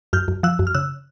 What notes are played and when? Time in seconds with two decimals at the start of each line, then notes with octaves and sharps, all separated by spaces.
0.13 F#2 F6 G6
0.28 F#2
0.43 F3 E6 F#6
0.59 F#2
0.67 F6
0.74 C#3 E6 F#6